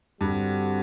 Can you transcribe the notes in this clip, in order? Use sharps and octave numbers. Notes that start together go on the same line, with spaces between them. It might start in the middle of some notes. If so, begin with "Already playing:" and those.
G2 D3 G3 C4 F#4